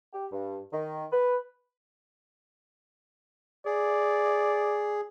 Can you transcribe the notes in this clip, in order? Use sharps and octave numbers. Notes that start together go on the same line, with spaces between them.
G4
G2
D#3
B4
G#4 D5